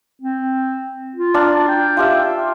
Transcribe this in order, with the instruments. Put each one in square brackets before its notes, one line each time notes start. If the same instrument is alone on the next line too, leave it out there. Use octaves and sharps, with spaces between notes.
[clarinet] C4
F4
[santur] D4 F5 A#5
[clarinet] G5
[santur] F4 G4 E5